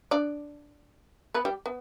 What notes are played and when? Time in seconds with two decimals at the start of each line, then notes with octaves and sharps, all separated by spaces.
0.11 D4 D5
1.34 B3 B4
1.45 G3 G4
1.66 B3